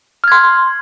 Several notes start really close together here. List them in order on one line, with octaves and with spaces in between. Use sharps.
F6 G#6 C6